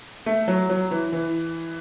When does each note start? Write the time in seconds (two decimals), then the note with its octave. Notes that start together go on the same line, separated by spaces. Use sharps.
0.26 A3
0.48 F#3
0.69 F#3
0.91 E3
1.12 E3